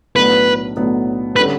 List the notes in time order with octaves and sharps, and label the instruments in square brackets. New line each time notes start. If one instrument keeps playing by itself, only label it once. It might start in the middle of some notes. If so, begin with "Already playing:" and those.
[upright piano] B1 A2 F#3 B3 D4 [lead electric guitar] B4
[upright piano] B1 A2 F#3 B3 D4
[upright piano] D3 G3 C#4 [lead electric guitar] B4